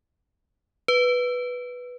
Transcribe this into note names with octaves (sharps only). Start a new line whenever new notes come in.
B4